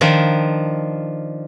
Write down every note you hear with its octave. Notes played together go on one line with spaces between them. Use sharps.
D#3 F3 D4